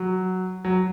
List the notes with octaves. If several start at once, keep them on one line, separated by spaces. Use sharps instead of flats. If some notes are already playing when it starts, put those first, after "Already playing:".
Already playing: F#3
F#3